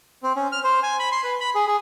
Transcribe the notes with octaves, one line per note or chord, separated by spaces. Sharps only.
C4
C#4
F6
C5
G#5
B5
C6
B4
B5
G#4
G#4